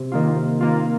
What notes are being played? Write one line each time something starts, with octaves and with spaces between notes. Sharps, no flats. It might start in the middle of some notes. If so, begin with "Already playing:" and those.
Already playing: C3
D#3 A#3 F4
C3
D#3 A#3 F4